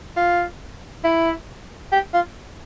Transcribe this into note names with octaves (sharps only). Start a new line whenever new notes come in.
F4
E4
G4
F4